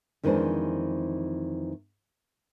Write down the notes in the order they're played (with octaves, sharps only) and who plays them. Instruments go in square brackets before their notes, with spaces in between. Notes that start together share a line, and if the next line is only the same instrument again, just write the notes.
[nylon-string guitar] F2 D#3 E3 G#3 D4 C5